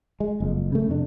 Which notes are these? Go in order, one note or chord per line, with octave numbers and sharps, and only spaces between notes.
G#3
F#1 F2
C#3 A3
F2 C3 D4